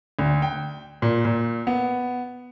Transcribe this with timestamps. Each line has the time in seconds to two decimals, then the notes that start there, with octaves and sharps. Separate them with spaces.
0.19 D2
0.42 G5
1.02 A#2
1.25 A#2
1.67 B3